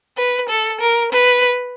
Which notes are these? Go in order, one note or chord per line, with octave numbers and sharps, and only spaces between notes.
B4
A4
A#4
B4